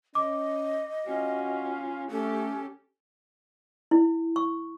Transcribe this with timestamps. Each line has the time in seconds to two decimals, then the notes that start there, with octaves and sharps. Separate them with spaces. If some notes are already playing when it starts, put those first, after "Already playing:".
0.15 C#4 D#5 D6
1.07 C#4 F4 F#4
2.11 A3 C#4 G4 A4
3.91 E4
4.36 C#6